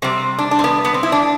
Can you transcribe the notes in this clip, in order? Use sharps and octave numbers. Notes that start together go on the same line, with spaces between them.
C3 G3 C4
D4
D4
C4
B3
B3
C4
E4
D4